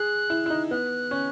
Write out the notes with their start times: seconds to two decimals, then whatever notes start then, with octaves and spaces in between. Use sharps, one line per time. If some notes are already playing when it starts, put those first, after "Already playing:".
Already playing: G#4 F#6
0.30 E4
0.46 E4
0.50 D#4
0.71 B3 F#6
1.11 C#4